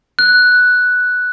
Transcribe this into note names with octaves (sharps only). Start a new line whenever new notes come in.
F#6